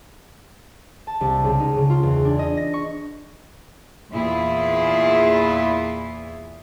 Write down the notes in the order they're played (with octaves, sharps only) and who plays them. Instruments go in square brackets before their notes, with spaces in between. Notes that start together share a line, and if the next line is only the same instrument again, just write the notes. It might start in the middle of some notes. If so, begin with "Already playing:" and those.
[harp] A5
C2
C#2
D#4
C#3
F4
E2
D4
D#5
A#6
C#6
[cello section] E2 A#2 E3 E4 F4 G#4